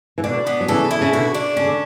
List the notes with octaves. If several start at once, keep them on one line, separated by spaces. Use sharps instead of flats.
E3
B2 D3 D4
B3
F#3
C#3 E3 A4
E4
C#3
B2 D3 F#4
D4
C#3 C#4
D3